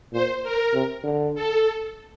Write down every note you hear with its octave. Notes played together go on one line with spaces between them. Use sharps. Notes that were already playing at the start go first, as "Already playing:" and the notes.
A#2 C5
A#4
C3
D3
A4